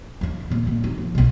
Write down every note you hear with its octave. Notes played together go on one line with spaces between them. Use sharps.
D#2 D4
D#2 A#2
A#1
D#3 D#4
F3
B1 B2